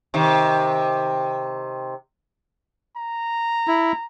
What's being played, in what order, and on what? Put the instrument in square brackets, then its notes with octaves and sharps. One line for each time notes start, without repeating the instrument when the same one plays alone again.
[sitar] C3 D#3
[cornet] A#5
[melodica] E4